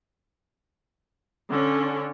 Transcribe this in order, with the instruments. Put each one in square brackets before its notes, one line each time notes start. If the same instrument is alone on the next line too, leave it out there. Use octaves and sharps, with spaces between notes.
[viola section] D3 C#4 A4